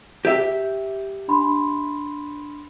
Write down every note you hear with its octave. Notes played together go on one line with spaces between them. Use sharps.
G4 E5
D4 B5 C6